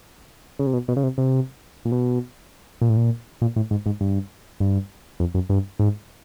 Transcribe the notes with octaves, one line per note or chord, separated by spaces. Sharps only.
C#3
C3
B2
B2
C#3
C3
C3
A#2
B2
A#2
A2
A#2
A#2
A2
G#2
G#2
G2
G2
F2
F#2
G2
G#2